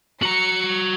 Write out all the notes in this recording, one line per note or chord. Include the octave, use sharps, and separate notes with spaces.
F#4 A#5 C#7